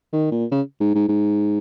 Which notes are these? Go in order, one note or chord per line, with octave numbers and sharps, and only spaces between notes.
D#3
A#2
C#3
G#2
G#2
G#2